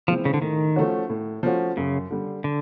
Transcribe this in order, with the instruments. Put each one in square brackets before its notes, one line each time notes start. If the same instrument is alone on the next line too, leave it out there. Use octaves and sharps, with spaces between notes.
[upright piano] E3 G#3 C4 [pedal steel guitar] F3
[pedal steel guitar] C#3
D3
[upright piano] A2 [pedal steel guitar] D#3
[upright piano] F3 A3 C#4 F#4
A2
F3 A3 C#4 F#4
[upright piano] F#2 [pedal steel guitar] C#3
[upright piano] D3 G3
[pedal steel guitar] D3